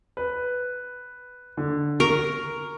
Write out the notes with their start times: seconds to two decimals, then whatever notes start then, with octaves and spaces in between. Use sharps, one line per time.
0.17 B4
1.57 D3
2.00 A#4 C#6